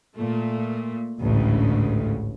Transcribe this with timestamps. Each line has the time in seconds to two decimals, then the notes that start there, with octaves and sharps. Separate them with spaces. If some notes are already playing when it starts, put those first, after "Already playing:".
0.15 A#2 A3
1.20 A1 D2 G#2 C#3